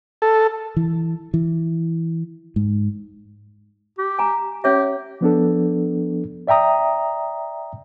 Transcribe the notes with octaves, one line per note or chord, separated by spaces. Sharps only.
A4
E3
E3
G#2
G4
G#5 A#5
C#4 G4 C#5 E5
F3 B3 D4 A4
D5 E5 G5 A#5 D#6